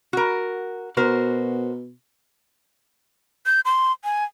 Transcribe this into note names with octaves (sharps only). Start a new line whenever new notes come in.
F#4 A#4
B2 F#4 A#4 C5
G6
C6
G#5